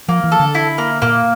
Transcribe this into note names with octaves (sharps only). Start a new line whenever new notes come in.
F3 A#3
E3
A4
D3
E4
A#3
A#2 A#3